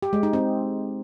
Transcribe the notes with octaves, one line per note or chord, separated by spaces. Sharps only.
G4
G#3
D#4
C4